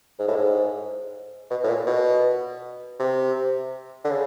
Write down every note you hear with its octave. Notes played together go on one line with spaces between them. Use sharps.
G#2
A2
G#2
B2
A2
A#2
B2
C3
D3
C#3